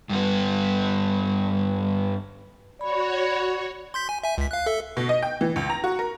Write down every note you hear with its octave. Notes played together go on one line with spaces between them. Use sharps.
G2 B3
F#4 C#5 D5 B5
C6 G6 B6
G#5
E5 G#5
C#2 B6
F5 F#6
A4 E5
B2
D#5
G5
E3
C#2
A#5
F#4
A#4